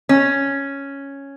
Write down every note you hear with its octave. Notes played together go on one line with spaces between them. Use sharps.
C#4